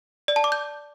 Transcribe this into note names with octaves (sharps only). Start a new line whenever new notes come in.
D5
A5
D6
G6